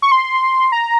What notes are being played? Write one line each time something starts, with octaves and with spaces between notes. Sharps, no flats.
C#6
C6
A#5